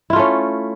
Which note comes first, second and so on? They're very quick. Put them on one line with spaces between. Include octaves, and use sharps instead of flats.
E4 F4 A3 C#4